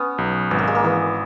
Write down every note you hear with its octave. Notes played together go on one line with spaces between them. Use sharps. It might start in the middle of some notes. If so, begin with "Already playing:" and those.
Already playing: B3 C#4
B1
G#1 B3
A#3
G#3
A#3
E3 B3